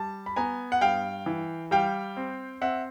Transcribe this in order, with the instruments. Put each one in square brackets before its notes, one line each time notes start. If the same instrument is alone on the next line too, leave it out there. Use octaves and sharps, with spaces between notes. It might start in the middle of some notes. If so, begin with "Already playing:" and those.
Already playing: [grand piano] G3 A5
B5
B3 G#5 A#5
F#5
G2 F5 G5
E3
G3 F5 G5
C4
C4 E5 F#5